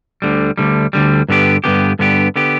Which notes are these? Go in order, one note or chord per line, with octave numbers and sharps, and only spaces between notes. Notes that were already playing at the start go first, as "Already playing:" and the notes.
D2 D3 G3
D2 D3 G3
D2 D3 G3
G2 D3 B3 G4
G2 D3 B3 G4
G2 D3 B3 G4
D3 B3 G4